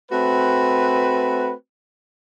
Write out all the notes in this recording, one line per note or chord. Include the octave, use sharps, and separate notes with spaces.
A3 C4 F#4 B4